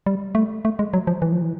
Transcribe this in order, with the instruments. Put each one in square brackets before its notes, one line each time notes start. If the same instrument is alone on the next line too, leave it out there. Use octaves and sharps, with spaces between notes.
[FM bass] G3
A3
A3
G#3
F#3
F3
E3
F3
E3